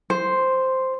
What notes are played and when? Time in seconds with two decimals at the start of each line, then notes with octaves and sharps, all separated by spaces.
0.10 C5